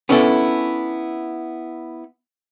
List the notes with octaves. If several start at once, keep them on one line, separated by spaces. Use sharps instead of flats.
B3 C#4 D4 E4 A4